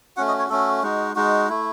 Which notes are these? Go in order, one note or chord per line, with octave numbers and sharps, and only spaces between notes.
A3 C#4 F#4 F#5
D#5
C#5
A3 C#4 F#4 A4
G#3 D#4 F#4
G#3 D#4 F#4
A3 E4